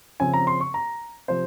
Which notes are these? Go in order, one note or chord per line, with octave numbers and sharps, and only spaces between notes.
C#3 F3 C4 G#5
A#5
C6
C#6
A#5
C3 F3 C5